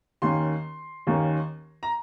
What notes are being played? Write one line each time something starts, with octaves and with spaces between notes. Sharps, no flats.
D#2 D#3 A#3 C#4 C6
D#2 D#3 A#3 C#4
A#5